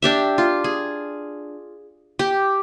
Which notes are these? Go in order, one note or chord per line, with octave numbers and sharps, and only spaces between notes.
D4 G4 E5
F4
G#4
G4